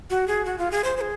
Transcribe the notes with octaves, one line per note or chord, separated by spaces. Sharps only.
F#4
G#4
F#4
F4
G#4
C5
C5
G#4